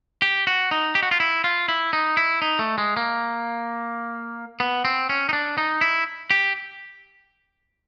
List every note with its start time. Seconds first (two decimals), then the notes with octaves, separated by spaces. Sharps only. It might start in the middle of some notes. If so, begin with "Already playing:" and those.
0.22 G4
0.47 F#4
0.71 D#4
0.95 G4
1.03 F#4
1.11 F4
1.20 E4
1.44 F4
1.68 E4
1.93 D#4
2.17 E4
2.42 D#4
2.59 A3
2.78 G#3
2.97 A#3
4.60 B3
4.85 C4
5.09 C#4
5.29 D#4
5.33 D4
5.58 D#4
5.81 E4
6.31 G4